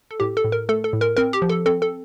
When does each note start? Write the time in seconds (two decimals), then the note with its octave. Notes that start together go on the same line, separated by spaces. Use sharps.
0.11 A4
0.20 A2 G4
0.37 A4
0.44 A2
0.52 A#4
0.69 A3 A4
0.84 A4
0.93 A2
1.01 A#4
1.17 C4 A#4
1.33 G4
1.42 F3
1.49 A4
1.66 C4 A4
1.82 A4